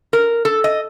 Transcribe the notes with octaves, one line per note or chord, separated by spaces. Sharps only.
A#4
A4
D#5